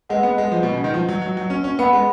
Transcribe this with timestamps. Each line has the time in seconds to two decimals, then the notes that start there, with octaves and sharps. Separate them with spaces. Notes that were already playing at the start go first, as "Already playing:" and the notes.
0.09 G#3 B4 D#5 F#5
0.23 B3
0.38 G#3
0.52 F3
0.63 B2
0.72 C#3
0.84 D#3
0.94 F3
1.09 F#3
1.22 F#3
1.37 F#3
1.50 C#4
1.64 C#4
1.79 B3 B4 F#5 B5
1.93 G#3